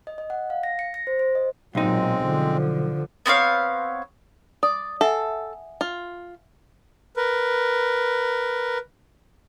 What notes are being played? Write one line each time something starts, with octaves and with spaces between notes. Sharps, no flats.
D#5
D#5
F#5
F5
A#6
C#7
A#6
C5
C5
D#5
B1 A#2 F#3 G#3 C4 D#4
D3 F3
B3 C4 C#5 F5
D5 D#6
A4 E5 F#5 G#5
F4
A#4 B4